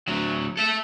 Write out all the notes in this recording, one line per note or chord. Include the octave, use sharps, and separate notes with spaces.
D2 F#3
A4 E5